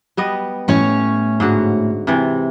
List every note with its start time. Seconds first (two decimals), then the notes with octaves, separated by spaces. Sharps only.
0.17 G3 B3 D#5
0.68 A2 C#4 C#5
1.40 G#2 D3 F#4
2.07 C3 E3